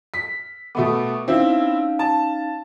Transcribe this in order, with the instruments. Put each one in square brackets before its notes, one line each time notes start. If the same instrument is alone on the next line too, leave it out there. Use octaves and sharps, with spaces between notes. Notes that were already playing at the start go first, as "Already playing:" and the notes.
[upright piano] B6
[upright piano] B2 A3 B3 [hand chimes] E5 D6
[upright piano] C4 E4 [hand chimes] C#4 D#4 F5
[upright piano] A5